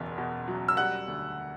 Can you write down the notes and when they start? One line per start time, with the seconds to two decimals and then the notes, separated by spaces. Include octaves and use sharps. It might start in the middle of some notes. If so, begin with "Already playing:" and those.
Already playing: F#1 E2 B2
0.18 B2
0.48 F#3
0.68 E6
0.77 G3 F#5 F#6
1.08 D2